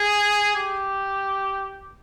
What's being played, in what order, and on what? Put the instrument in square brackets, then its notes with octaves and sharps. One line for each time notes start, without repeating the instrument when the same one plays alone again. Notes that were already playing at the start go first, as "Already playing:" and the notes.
Already playing: [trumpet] G#4
G4